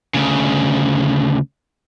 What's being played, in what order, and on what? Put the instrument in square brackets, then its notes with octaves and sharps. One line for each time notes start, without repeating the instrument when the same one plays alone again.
[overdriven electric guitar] D2 C#3